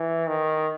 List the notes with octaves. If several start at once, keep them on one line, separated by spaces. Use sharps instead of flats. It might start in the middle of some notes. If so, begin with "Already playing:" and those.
Already playing: E3
D#3